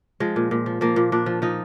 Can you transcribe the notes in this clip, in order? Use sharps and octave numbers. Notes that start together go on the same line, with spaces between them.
F3 G#3
A#2
A#2
F3
F3 A#3
A#2
A#2 D4
F3
F3 D#4